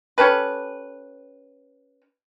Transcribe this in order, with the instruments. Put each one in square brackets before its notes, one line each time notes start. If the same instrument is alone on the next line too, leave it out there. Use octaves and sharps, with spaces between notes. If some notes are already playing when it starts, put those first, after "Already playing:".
[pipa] C#4 G4 A4 B4